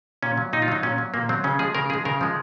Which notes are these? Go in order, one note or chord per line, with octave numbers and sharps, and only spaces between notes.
A#2 C#4
F#3
A#2 D#4
F4
F#3 D#4
A#2 C#4
F#3
A#2 A#3
F#3 C4
C#3 C#4
F3 G#3 G#4
C#3 A#4
F3 G#3 G#4
C#3 A#4
F3 G#3